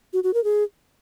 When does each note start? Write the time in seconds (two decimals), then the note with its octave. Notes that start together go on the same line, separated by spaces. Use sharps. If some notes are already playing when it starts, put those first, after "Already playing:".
0.13 F#4
0.24 F#4
0.34 A#4
0.44 G#4